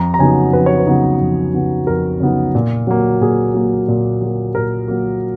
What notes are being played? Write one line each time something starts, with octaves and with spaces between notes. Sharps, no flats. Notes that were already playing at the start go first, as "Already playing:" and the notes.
Already playing: F2 A#5
A#5
C#3 F#3 B3 D#4 G#5
F2 B4
C#5
B4
C#3 F#3 B3 D#4
F2
C#3 F#3 B3 D#4
F2 A#4
C#3 F#3 B3 D#4
A#2
F#3 A#3
A#2 G#4
F#3 A#3
A#2
F#3 A#3
A#2 A#4
F#3 A#3